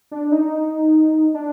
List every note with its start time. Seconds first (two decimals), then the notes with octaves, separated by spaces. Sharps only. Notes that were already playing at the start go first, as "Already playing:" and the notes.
0.11 D4
0.32 D#4
1.34 D4